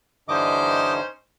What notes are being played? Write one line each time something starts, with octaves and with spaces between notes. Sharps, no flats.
G2 D3 E3 C#4 D#4 C5 D#5 D6